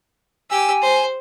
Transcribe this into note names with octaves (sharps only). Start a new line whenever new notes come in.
G4 G#5 E6
C5